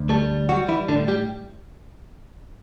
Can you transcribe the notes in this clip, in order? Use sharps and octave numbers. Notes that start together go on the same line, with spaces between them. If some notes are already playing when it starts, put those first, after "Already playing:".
Already playing: D2
G3 A3 A4
F#3 G3 F#4
E3 E4
A2 D3 D4
G3 G4